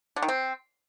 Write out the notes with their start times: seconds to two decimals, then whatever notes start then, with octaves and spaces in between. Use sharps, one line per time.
0.16 D3
0.22 D#3
0.29 C4